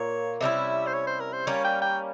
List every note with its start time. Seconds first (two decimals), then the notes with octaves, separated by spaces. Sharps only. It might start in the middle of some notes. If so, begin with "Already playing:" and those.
Already playing: A#2 A#3 C#5
0.41 C3 G3 C#4 E4 E5
0.87 C5
0.94 C#5
1.07 C5
1.20 A#4
1.33 C5
1.47 G3 A#3 C#4 C#5
1.65 G5
1.82 G5